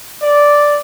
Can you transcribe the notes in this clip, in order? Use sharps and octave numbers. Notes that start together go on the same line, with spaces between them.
D5